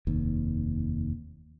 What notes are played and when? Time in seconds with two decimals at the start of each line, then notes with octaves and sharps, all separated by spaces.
0.07 F1 D#2